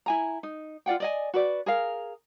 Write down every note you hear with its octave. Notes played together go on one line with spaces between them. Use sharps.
E4 G#5 A#5
D#4
F4 D5 F#5 G5
D5 D#5 G#5
F#4 B4 D5
G#4 A#4 F5